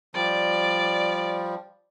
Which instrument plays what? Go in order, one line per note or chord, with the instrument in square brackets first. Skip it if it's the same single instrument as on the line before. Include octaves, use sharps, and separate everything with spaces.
[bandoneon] F3 G3 [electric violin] D5